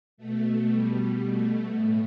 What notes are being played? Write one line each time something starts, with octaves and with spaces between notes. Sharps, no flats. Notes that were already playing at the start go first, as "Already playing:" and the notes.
B2 A3
B2 G3
B2 A3
A2